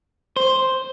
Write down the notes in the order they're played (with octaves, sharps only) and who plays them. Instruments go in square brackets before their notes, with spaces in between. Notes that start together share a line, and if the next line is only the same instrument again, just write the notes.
[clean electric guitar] C5